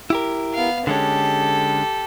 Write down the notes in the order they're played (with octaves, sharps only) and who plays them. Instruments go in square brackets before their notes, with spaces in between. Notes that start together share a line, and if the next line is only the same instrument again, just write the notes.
[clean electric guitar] E4 G4 A#4
[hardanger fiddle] B3 F5
[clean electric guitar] D3 G#3 C#4 [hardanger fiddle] G4 A4